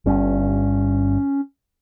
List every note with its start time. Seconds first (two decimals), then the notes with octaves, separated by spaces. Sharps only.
0.06 G1 G2 C#4